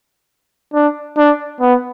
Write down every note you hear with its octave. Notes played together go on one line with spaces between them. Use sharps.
D4
D4
B3